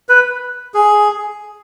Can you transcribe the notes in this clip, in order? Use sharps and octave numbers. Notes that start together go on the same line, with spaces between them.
B4
G#4